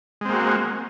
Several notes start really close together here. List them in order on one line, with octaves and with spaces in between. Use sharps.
G#3 C4 A#3 F#4